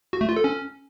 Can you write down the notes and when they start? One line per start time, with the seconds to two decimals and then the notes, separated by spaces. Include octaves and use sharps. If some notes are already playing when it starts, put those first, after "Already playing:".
0.13 F#4
0.21 A3
0.29 F4
0.36 A4
0.44 C#4